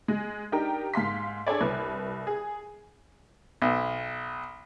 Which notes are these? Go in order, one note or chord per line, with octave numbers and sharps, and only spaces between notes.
G#3
D4 D#4 G4 A#4 G5
G#2 F5 C6 B6
D4 G#4 A4 C#5 D5
C2 B4
G#4
B1